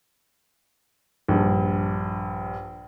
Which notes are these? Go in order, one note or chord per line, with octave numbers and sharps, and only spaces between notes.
A#1 G2